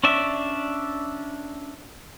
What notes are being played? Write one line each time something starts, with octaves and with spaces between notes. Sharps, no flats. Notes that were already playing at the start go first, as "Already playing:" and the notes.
C#4 D4 D5 E5